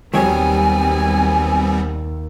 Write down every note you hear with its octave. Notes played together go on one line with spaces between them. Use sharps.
D#2 F#3 G3 B3 C4 G4 C#5 G#5